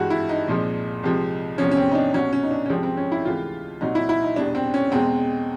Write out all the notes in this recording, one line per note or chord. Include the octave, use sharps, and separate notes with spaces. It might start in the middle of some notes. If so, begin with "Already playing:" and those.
Already playing: G2 E3 G#3 F#4
E4
D#4
C2 A#2 F3 G#3
C2 C3 F3 G#3
E2 C3 F3 C#4
C#4
C4
D#4
D4
C2 B2 F#3 C#4
C#4
D#4
D4
C#4
C2 C3 F3 G#3 C4
C4
C#4
E4
D2 C3 E3 G#3 F4
C2 A#2 F#3 D#4
E4
E4
D#4
E2 B2 G3 D4
C4
C#4
E2 B2 G#3 C4